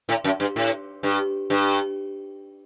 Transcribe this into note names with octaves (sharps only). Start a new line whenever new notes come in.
A2
F#2
G2
A2
G2
G2